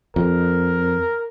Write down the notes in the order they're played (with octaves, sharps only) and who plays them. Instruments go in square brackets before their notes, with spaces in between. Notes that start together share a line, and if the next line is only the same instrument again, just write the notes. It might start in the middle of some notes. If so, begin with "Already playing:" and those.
[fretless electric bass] F2 [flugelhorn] A#4